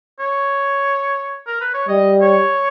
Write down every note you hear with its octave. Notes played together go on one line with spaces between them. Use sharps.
C#5
A#4
B4
C#5
G3 D#5
C#5